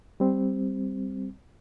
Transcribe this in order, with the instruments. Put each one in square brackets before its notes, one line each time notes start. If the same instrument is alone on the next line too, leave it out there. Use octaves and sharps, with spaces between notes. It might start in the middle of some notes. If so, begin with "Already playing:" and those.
[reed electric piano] G3 C4